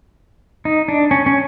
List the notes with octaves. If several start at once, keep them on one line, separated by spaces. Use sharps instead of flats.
D#4
D4
C#4
C#4